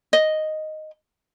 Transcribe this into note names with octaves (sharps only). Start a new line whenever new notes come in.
D#5